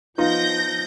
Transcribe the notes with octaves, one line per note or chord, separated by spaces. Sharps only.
F3 B3 D#4 F4 G6 A#6